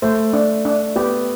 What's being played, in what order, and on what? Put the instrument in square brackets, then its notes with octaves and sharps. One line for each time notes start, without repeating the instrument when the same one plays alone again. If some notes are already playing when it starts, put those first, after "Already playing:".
[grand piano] A3 [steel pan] C5
[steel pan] D4
D4
[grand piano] B3 [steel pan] G4